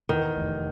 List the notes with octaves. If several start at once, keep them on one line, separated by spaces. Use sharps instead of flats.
E2 D#3
F1